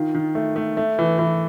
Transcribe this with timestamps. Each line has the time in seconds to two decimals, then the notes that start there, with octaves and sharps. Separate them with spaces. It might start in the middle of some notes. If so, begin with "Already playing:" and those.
Already playing: D#3 F4
0.15 D#3
0.35 A3
0.56 A3
0.77 A3
0.99 E3
1.19 E3